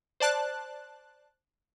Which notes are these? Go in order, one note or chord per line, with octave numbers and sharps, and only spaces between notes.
C5 D5 A5 F#6